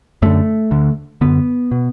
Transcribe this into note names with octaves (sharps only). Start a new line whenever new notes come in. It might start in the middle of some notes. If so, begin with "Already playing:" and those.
F#2 D3 A3
D2 D3
F#2 D3 B3
B2